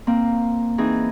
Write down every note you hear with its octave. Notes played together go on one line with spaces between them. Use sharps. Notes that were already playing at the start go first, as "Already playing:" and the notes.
A#3 C4
E3 C4 D#4 G#4